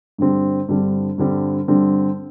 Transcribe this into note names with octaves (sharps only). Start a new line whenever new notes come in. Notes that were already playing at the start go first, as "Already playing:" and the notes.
G2 D3 G3 C4
G2 D3 G3 C4
G2 D3 G3 C4
G2 D3 G3 C4